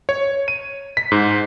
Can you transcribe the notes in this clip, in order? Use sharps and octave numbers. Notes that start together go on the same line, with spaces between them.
C#5
D#7
B6
G#2